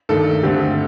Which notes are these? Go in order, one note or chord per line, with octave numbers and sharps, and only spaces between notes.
G2 D#3 A3 A4
G2 D3 A3 C4 G4